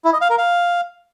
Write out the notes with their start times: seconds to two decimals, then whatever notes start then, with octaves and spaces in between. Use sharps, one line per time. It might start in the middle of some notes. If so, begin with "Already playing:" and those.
0.05 E4
0.13 D#5
0.21 F5
0.30 A#4
0.38 F5